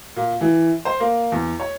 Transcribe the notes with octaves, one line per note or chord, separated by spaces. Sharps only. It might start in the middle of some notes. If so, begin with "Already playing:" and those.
A#2
E3
C5
A#3
E2
C#5